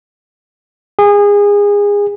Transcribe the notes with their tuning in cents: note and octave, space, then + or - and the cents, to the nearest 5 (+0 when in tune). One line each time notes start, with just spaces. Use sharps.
G#4 -25